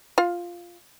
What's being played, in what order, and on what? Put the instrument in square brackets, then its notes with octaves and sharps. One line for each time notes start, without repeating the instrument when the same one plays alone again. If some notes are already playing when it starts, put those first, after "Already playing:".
[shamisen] F4 F5